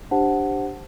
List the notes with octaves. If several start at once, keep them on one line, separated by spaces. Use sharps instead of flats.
D4 G4 C5 F#5 A5